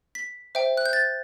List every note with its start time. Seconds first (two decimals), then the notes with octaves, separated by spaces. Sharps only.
0.15 B6
0.55 C5 E5 G5
0.77 F#6
0.86 G6
0.93 A6